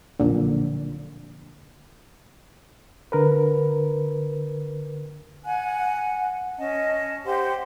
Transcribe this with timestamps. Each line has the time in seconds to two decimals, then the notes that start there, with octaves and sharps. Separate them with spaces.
0.19 B1 F2 A#2 D3
3.12 D3 A#4 B4
5.45 F#5 G#5 F#6
6.58 C#4 D#5 A5
7.25 G4 C5 F#5 C6